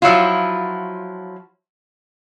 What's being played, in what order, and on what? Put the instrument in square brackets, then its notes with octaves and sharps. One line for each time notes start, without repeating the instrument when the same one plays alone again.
[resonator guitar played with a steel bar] F3 F#3 E4 F4